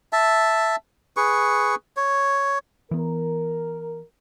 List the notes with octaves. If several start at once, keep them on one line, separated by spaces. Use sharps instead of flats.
E5 A5
G#4 B4 C#6
C#5
E3 B3 A#4